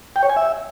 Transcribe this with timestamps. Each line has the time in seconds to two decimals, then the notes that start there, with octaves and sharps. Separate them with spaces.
0.16 G5
0.23 C#5
0.30 G#5
0.36 E5